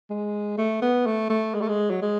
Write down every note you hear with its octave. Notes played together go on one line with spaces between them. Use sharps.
G#3
A3
B3
A3
A3
G#3
A3
G#3
F#3
G#3